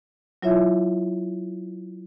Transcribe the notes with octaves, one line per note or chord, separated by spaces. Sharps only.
F#3 E4 F4 C#5 E5